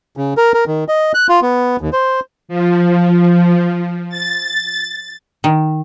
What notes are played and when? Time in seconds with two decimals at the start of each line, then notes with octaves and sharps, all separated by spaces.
0.17 C#3
0.37 A#4
0.54 A#4
0.67 D#3
0.88 D#5
1.14 F#6
1.29 F4
1.42 B3
1.81 D#2
1.93 C5
2.49 F3
4.10 A6
5.44 D#3